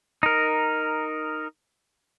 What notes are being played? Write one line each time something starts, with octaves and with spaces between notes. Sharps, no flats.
D#4 A#4